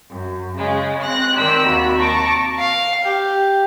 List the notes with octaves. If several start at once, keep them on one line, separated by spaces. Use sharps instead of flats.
F#2
C#3 G#3
C4 F#6 A#6
D#3 G4 C5 D5 G5 E6
D#2 C3 A#3 F#4 B5
A5 A#5 C#6 D6
F5
G4